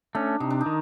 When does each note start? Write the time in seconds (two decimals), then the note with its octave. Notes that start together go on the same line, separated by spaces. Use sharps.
0.15 A3 C#4 D4
0.40 C3 D#4
0.50 D4
0.61 D#4
0.66 D#3